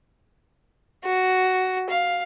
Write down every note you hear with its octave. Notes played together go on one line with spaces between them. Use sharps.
F#4
F5